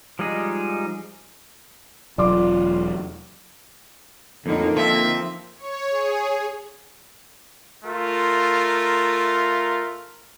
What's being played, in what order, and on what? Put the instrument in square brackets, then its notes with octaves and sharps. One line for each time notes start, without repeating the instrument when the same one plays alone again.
[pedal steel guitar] F3 G3 G#3 D#4 G#4
[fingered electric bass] E1 F#3 [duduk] F4 [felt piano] D5 C6 D6
[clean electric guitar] F2 A2 [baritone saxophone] D3 [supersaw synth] A#3 D#4
[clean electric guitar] F3 C4 [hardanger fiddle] E5
[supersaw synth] C#5
G#4
[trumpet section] A3 F4 A#4